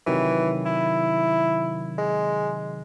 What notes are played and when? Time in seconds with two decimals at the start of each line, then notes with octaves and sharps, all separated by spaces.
0.07 C3 D#3 E3 F#3
0.66 E4
1.98 G#3